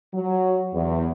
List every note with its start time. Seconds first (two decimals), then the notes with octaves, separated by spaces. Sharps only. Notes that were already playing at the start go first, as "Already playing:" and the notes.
0.15 F#3
0.74 E2